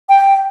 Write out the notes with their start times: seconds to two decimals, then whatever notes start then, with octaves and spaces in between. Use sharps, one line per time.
0.09 G5